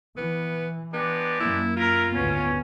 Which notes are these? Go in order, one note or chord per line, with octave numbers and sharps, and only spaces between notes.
E3 B3
G#3 B3 D4 G4
F#2 A#3 E4
E4 F4 A#4
G#1 D2 B3 C#4